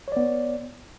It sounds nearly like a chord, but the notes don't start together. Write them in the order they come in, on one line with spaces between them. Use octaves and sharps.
C#5 D5 B3